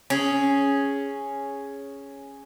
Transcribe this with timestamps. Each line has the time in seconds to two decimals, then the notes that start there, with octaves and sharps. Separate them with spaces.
0.10 C#4 G#4